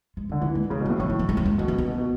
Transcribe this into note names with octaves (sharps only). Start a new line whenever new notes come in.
G#3
D3 A3
E3 B3
G#3
C#3 G#3
B2
A2 F#3
A2 E3
E3
F#3
G#3
F#3
G#3
B2 F#3
A3
B3
B2
B2